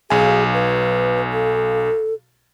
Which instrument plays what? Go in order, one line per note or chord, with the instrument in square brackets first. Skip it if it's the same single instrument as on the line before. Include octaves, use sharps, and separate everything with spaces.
[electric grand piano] B1 F5 G#5 [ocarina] G#4
[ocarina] B4
A4